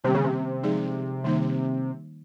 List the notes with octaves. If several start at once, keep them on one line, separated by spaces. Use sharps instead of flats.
C3 D#3 G3 A#3 C#4
C#3
C3
F3 G#3 D#4 G#4
D#3 G3 A#3 D#4